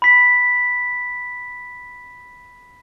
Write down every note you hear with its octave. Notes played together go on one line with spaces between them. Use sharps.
B5 B6